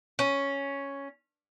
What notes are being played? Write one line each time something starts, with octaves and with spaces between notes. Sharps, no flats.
C#4